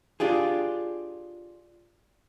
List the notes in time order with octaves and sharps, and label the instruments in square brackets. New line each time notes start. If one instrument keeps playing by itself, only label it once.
[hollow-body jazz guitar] D4 F4 G4 G#4